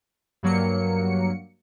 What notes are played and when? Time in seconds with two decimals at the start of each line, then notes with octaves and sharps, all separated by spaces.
0.43 G2 F#3 A#3 C#7